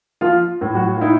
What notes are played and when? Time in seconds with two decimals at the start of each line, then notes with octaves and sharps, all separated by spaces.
0.21 F3 F4
0.61 A2
0.75 F#3 F#4
0.96 F4
1.01 D#4 E4